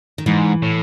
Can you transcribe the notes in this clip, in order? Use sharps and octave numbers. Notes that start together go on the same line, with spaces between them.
D#3
G#2 E3
A2